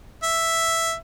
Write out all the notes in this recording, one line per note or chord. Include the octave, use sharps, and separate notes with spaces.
E5